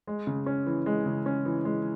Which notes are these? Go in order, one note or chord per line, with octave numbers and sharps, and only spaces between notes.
G#3
C#3
C#4
E3
G#3
C#3
C#4
E3
G#3